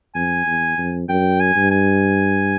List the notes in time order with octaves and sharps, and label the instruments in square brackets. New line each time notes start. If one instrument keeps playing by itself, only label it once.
[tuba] F2 [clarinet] G#5
[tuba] E2
F2
[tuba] F#2 [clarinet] G5
[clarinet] G#5
[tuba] G2
[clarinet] G#5